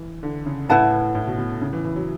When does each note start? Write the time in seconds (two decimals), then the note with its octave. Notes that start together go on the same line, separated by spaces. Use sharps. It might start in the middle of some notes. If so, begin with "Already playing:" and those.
Already playing: E3
0.23 D3
0.46 C#3
0.69 A2 E4 B4 F#5 A5
1.15 A2
1.27 B2
1.38 B2
1.61 C#3
1.73 E3
1.84 E3
1.96 F#3